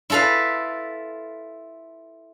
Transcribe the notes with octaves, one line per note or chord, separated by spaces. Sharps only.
E4 F4 A4 B4 F5